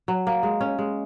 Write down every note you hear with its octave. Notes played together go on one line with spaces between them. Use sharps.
F#3
A#3
G#3
C#4
G#3